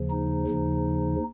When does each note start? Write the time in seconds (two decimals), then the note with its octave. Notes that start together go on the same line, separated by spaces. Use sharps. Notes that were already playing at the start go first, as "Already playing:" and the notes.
Already playing: D#2 C#3 F3
0.10 D#4
0.47 D#2 C#3 F3